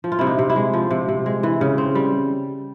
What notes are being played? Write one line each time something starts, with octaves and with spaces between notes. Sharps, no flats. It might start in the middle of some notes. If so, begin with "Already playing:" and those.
F3
F4
C3 E4
D#4
C3
E4
G#3
F3
C3
C3
G#3
E3
C#3
C4
G3